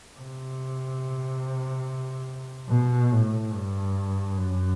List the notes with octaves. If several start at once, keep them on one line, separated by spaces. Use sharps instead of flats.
C3
B2
A2
G2
F#2